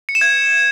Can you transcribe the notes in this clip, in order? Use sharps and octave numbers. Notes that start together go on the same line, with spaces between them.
C#7
E7
G#6